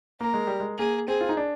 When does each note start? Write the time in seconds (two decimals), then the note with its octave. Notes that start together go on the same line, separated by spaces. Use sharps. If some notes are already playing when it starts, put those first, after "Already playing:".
0.21 A#3 A#4
0.34 G#3
0.47 G3
0.60 G#3
0.78 A#3 G#4
1.08 C4 G#4
1.21 F4
1.29 D#4
1.37 D4